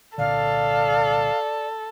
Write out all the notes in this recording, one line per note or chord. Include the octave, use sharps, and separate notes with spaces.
C2 A#2 D3 A4 D5 F5